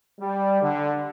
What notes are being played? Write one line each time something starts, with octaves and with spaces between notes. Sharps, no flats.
G3
D3